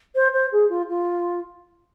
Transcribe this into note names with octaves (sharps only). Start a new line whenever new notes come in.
C5
C5
G#4
F4
F4